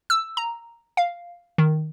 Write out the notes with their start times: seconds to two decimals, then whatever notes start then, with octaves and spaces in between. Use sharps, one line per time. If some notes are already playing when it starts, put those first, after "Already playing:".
0.10 E6
0.37 A#5
0.97 F5
1.58 D#3